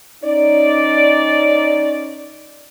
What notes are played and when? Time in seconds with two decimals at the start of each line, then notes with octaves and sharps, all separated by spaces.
0.24 C#4 D#4 D5